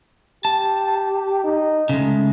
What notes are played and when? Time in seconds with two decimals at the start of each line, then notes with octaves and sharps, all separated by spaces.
0.45 G4 A5
1.44 D#4
1.89 C#3 G#3 A3